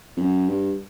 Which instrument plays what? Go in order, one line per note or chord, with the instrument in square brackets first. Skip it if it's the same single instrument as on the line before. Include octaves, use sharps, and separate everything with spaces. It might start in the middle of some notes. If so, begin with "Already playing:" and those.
[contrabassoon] F2
F#2
G2